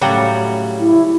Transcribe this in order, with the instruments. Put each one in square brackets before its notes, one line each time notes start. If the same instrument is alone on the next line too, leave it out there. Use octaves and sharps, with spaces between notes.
[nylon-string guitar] A2 C#3 [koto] F#3 G3 F#4
[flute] E4